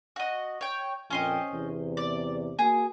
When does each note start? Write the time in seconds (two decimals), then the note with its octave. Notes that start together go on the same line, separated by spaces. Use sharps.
0.16 F#4 D#5
0.61 C#5 G5
1.10 F2 A#2 C#4 C5 D#5 G5
1.52 E2 C3
1.97 D5
2.59 A#3 F#4 G#4